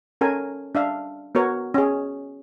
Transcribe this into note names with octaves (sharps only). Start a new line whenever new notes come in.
C#4 A4 A#4 G#5
D4 E5 F5
B3 F#4 A#4 C#5
C#4 G#4